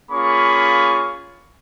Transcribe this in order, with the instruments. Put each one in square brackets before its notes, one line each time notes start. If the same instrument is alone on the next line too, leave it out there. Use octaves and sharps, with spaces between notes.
[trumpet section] A#3 C#4 F4 G#4 B5 C#6